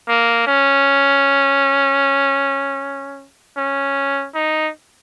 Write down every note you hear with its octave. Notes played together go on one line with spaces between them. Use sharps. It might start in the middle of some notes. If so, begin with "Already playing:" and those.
A#3
C#4
C#4
D#4